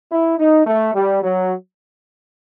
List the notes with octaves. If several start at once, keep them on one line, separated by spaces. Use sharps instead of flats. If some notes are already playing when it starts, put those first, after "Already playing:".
E4
D#4
A3
G3
F#3